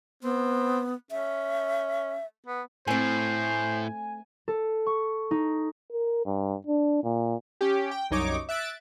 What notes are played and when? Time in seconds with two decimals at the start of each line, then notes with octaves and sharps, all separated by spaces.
0.23 B3 C4
1.11 C#4 E5
2.46 B3
2.87 A2 A3 C4 C5 G#5
4.48 A4
4.87 C#6
5.31 D#4
5.92 A#4
6.25 G2
6.67 D4
7.04 A#2
7.61 C#4 G4
7.91 G5
8.11 C2 F#2 D#4 C#5 D6
8.49 E5 F#6 A6 D7